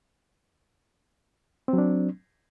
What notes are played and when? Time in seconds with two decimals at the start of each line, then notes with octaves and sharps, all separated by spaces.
1.68 C4
1.73 F#3
1.78 D4